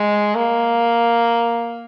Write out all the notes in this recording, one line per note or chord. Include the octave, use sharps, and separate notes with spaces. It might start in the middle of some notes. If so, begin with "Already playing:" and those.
Already playing: G#3
A#3